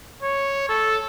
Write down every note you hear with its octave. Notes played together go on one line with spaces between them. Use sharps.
C#5
A4